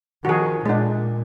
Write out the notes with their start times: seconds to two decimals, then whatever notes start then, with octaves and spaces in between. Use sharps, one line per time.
0.25 D#3 F3 F#4 G#4
0.66 A#2 G#3 D4